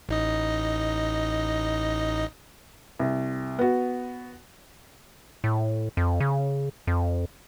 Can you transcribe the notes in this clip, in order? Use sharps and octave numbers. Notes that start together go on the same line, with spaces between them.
A1 D#4 D#5
C2
B3 F#4
A2
F2
C#3
F2